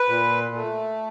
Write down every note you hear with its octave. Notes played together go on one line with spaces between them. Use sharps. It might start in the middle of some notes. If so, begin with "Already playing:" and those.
Already playing: B4
A#2
A3